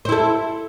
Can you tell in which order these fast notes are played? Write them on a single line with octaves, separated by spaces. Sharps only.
C5 E4 A4